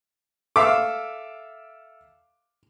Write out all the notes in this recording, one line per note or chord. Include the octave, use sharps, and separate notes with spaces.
A4 E5 F5 D6